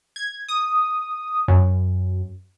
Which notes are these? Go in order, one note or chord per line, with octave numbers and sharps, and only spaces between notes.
G#6
D#6
F#2